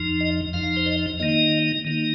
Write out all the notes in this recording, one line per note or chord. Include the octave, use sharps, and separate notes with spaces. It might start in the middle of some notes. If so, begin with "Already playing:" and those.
Already playing: F2 F3 D#4
D#5
F2 F3 D#4 F5
C5
D#5
D#3 A#3 D#4 D#5
D#3 A#3 D#4